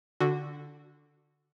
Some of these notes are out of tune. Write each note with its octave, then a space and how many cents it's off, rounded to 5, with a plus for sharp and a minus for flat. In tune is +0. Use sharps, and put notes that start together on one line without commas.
D3 +0 F#4 -10